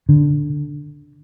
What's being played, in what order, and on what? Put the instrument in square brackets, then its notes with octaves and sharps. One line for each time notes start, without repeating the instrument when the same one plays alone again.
[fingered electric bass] D3